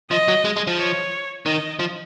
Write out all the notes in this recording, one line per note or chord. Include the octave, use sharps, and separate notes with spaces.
F3 D#5
F#3
G#3
G#3
F3
C#5
D#3 D#5
F3